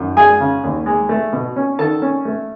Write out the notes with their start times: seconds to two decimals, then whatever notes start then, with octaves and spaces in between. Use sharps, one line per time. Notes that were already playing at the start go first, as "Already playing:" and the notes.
Already playing: F#2 D#3
0.17 G#3 G#4 G#5
0.40 C#3
0.64 D#2
0.86 G#3
1.09 A3
1.33 B2
1.56 C#4
1.79 D#3 A4 A5
2.02 C#4
2.25 A3